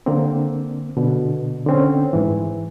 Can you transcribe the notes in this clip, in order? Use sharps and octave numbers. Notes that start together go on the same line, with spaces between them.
D3 A#3 C4
B2 D3
D3 C4 C#4
G#2 E3